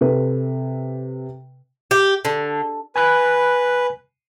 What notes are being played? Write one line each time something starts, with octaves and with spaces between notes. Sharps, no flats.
C3 A4 B4
G4
D3
B4 G#5 B5 F#6